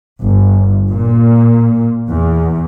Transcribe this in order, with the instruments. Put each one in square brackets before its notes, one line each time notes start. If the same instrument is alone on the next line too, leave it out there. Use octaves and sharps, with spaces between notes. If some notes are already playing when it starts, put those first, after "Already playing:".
[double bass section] G1
A#2
E2